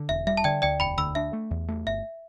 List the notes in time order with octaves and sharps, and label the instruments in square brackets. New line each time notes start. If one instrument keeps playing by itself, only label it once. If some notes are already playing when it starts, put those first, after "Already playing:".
Already playing: [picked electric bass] D3
[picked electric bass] E1 [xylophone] E5
[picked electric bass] G3 [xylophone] E5
[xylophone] A5
[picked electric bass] D3 [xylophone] D5 G5
[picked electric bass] D2 [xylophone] D5 G5
[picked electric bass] E1 [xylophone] G5 B5
[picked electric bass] D2 [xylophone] B5 E6
[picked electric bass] D4 [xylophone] E5
[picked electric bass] A3
E2
A3
[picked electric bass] G1 [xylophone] E5